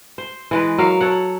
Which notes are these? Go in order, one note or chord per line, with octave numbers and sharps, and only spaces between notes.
C5
E3 G#3 B4
F#3 A#4 F5
A4 C#5 F#5